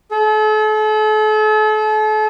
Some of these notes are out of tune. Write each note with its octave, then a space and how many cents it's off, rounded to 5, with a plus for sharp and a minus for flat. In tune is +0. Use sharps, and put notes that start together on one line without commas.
A4 -40